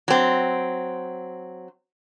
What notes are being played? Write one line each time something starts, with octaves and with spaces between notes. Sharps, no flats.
F#3 C4